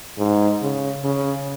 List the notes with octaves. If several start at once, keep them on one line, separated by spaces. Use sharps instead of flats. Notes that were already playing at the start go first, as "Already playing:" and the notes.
G#2
C#3
C#3